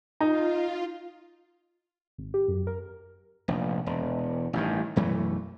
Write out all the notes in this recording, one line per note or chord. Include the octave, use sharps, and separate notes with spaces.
D#4 F4
G#1
G4
F#2
A#4
F1 A#1
E1
A1 G2 D#3
B1 F#2 E3 A3